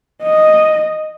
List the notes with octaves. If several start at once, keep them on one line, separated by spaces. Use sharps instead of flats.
D#5